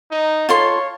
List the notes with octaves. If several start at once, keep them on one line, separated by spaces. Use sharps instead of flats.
D#4
F4 A4 C#5 C6